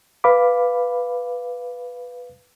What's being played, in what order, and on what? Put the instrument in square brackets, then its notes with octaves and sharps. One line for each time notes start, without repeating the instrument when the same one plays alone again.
[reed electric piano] B4 F5 B5 D6